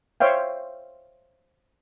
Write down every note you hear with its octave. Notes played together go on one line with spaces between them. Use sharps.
C5 C#5 E5 F5 G5